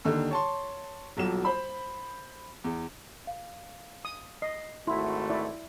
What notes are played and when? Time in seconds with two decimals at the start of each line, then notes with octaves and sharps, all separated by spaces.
0.05 D#2 D3 D#3
0.31 C#5 A5 C6
1.17 D#1 B1 F#3 F4 E7
1.45 C5 B5
2.64 E2
3.27 F5
4.05 D#6
4.42 D#5 C7
4.87 G#1 A3 E4 F#4 B5 C6
5.30 E4 D5